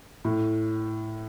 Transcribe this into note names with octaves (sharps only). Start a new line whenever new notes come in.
A2